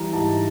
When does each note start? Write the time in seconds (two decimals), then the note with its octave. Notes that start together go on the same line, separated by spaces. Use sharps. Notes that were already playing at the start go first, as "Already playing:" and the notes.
Already playing: E3 G3 A#5
0.13 G#2 A5